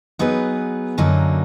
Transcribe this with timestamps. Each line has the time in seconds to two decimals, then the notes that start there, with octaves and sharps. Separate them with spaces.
0.19 F#3 B3 D#4 G#4 B4
0.98 F#2 D3 F#3 A#3 D#4